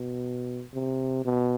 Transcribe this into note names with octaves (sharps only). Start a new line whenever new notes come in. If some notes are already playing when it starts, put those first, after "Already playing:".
Already playing: B2
C3
B2